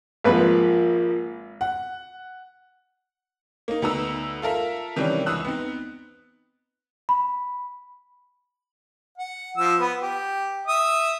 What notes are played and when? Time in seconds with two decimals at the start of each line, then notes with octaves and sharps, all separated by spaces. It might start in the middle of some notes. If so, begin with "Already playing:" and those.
0.24 G#1 F3 A#3 B4
1.61 F#5
3.68 A#3 D#4
3.82 D2 B3 D#4 B4 A#5 E6
4.42 F4 A4 A#4 E5
4.96 C3 D#3 E3 G3 C#4 D4
5.26 C#2 E3 D#6 E6 F#6
5.45 B3 C4 D#4
7.09 B5
9.18 F#5
9.57 F3 E6
9.80 B3 B4
10.02 G4
10.67 E5 D#6